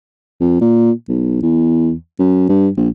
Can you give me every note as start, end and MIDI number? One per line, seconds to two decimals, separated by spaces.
0.40 0.60 41
0.61 0.91 46
1.08 1.42 35
1.42 1.93 40
2.19 2.46 42
2.49 2.69 43
2.77 2.88 34